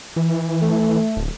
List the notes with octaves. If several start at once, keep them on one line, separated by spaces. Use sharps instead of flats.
E3
A3
D1